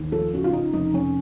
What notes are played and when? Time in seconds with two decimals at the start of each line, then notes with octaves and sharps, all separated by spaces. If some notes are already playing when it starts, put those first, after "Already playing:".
Already playing: D#2
0.12 F3 A4
0.33 C#3 F#4
0.44 F4
0.53 C#3 D#4
0.73 F1 D#4
0.94 F1 C#4